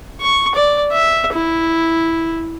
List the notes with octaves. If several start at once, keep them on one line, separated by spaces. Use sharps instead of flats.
C#6
D5
E5
E4